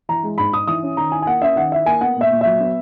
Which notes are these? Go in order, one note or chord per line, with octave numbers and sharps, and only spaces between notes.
E3 A#5
G#3
G#2 B5
D#4 D#6
E3 D#6
C#4
D#3 A#5
E4 G#5
G#5
A#3 F#5
C#4 E5
D#3 F#5
E4 E5
A#3 G#5
B3 F#5
A#2
E5
A#2
F#3 E5
B3